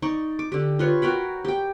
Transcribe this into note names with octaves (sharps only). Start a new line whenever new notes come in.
D#4 D5 C#6
D6
D3 G4
F4 B4 C#5
F#4 A#4 G5 B5
G4 G5